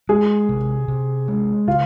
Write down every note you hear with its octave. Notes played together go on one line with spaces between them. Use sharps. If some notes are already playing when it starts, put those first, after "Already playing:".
G#3 G#4
C3
C3
G#3
C#3 F4